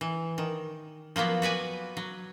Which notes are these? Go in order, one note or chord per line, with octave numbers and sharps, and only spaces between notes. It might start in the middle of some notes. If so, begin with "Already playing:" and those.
E3
D#3
F3 F#3 A#3 B3
F#4 B4 D5 G#5
F#3